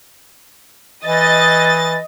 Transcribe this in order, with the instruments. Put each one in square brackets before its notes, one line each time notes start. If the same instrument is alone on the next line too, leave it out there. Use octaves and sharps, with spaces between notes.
[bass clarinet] E3 [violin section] D#5 A6